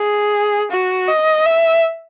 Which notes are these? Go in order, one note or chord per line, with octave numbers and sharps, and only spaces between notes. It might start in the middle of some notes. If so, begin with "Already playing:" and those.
Already playing: G#4
F#4
D#5
E5